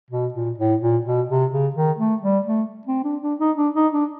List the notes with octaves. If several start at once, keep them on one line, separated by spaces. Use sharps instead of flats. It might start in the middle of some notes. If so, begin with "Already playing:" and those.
B2
A#2
A2
A#2
B2
C3
C#3
D#3
A3
G3
A3
C4
D4
D4
D#4
D4
D#4
D4